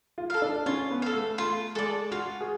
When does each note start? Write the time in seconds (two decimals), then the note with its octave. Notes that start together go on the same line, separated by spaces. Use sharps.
0.18 F4
0.30 A4 F5
0.42 D4
0.66 C#4 F4
0.91 B3
1.02 A4 F5
1.14 A3
1.38 A3 F4
1.75 G#3 A4 D5
2.11 F4 F#4
2.41 G#4